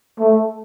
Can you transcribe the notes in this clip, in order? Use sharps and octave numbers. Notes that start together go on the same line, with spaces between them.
A3